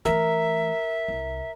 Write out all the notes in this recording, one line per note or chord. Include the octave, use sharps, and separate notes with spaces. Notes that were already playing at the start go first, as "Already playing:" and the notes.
E3 A3 A#4 E5
C2